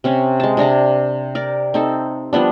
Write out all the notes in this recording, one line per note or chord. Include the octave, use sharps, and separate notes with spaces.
C3 C4 C#4
G#3 A5
C3 D4 A#5 D6
A#4 D5
C4 D#4 A4
F3 G3 B3 D4